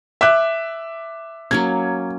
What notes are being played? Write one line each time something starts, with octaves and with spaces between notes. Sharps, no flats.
E5 D6 F#6
F#3 A#3 C#4 G#6